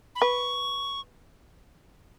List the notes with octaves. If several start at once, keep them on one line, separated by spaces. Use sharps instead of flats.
B5
B4 C#6